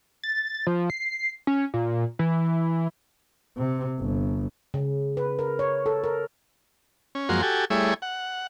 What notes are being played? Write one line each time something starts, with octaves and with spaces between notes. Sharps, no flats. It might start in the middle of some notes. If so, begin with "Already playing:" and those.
A6
F3
C7
C#4
A#2
E3
C3
G1
C#3
B4
A#4
C#5
A4
A#4
C#4
F#2 F3 G#3 A#3 F#4 C6
F#4 G4 A4 G#5
G3 A3 E4 G#4 C#5
F#5